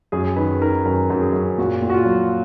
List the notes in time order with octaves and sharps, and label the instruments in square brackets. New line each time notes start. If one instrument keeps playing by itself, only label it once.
[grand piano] F#2 G#4
D#3 B4
D#3 A#4
F#2 A#4
F#2
G#4
F#2
A#2 F#4
A#2
F#4
F4
F#3